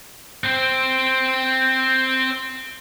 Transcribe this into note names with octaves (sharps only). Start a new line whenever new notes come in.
C4 C5